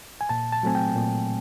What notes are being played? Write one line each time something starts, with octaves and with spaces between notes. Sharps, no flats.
G#5
A#2 A5
A5
F#3 A3 C4 G#5
G5
A#2